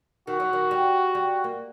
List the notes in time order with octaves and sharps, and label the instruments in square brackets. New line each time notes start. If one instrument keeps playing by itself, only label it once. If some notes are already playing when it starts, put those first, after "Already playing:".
[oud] D#3 [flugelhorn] F#4
[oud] F#3
D#3
G3
G3
A#3